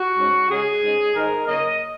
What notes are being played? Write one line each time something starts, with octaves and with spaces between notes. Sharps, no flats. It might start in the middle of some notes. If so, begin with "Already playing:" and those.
Already playing: F#4
G#2 G#3 C#4
C#3 G#3 C#4 G#4
G#2 G#3 C#4
G#2 D#3 G#3 A#4
C#3 F#3 A#3 C#4 D#5